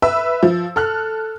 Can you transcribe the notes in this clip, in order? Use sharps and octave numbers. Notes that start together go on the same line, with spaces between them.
B4 E5 E6
F3
A4 F6 F#6